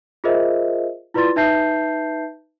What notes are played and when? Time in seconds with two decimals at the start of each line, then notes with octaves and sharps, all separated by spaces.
0.24 F4 G#4 A#4 C5 D#5 E5
1.14 E4 F4 B4 D5 C6 A6
1.36 D#4 B4 E5 A5 G6 C7